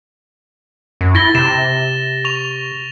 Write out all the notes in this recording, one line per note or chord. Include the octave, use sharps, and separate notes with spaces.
F#2
E4 A6 A#6 G7
C3 E7
C#6 F7